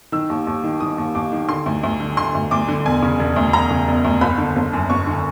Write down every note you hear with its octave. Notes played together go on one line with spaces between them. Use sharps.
D#3 E6
D#2
D#2
D#3
D#3 D#6
D#2
D#2 D6
D#3
D3 C6
D2
D2
D3
D3 C6
D2
D2 D6
D3
E1 G#5
C#3
E1
D2
E1 A#5
C#3
E1
D2
F#1 B5
D3
F#1
F#2
F#1 C#6
D3